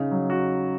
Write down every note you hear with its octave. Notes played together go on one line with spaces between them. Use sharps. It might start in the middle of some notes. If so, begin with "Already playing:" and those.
Already playing: C#3 D#4
F#3
F#4